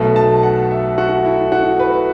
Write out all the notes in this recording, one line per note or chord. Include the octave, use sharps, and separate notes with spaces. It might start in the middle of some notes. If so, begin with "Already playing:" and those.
Already playing: B1 B2 A3
A5
F#5
E5
F#4
E4
F#4
B4